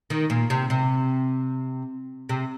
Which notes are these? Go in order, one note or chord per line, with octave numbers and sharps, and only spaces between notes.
D#3
A#2
C3
C3
C3